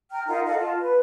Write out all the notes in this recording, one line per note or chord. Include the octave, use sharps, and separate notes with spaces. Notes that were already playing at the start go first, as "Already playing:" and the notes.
G5 A#5 F6
D#4 F4 A#4 F#5
A4 D#5 F5 F#5
F4 A5
B4